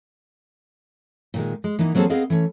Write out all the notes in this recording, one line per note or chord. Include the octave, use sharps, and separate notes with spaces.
A#2 D#3 G#3
G#3
E3 A#3 B3 D#4
F#3 A#3 C4 F#4 G#4 A4
B3 C4 G#4 A#4 D#5 F5
E3 A3 C#4